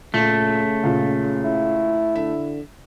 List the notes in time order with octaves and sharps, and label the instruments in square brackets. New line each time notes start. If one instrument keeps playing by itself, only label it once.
[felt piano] A#2 [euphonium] C#3 [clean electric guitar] A3
[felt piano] C#2 A#2
[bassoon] E4
[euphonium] D3 [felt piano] E5